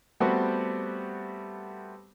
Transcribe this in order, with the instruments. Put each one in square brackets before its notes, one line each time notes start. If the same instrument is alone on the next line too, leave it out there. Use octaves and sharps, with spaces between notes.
[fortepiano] G3 A3 B3 C4 F#4 G4